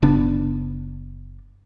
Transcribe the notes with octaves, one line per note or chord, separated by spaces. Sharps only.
F#1 C#3 B3 D4